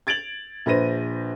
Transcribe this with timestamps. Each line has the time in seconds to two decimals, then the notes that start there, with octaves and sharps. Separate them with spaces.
0.07 G#6 A6 D7 F7 F#7
0.66 A#1 B4 C5 A#6 D#7